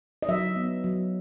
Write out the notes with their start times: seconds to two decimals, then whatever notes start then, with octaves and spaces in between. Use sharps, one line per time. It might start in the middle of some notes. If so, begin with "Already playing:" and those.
0.22 D#5
0.29 F#3 E5
0.56 B3
0.84 F#3